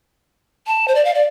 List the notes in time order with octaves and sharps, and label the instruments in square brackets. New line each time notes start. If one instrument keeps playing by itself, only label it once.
[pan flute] A5
C5
D5
F5
D5